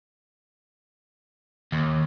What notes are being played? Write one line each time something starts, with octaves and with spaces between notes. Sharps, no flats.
D#2